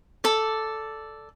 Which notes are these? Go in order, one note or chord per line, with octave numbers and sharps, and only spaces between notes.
A4 D5